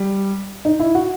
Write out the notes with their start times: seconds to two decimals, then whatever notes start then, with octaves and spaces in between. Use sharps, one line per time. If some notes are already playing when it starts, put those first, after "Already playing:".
Already playing: G3
0.65 D#4
0.80 E4
0.95 F#4